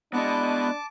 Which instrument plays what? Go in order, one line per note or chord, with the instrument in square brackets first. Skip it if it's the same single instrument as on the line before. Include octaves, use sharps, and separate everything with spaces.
[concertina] G#3 E4 F#6 [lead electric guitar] B3 D#5 [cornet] D4 [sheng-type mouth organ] A5 D6